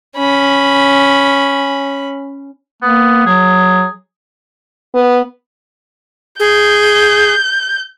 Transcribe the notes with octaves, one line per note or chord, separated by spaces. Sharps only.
C#4 B5
A#3 B3
F#3 G#4
B3
G#4 G6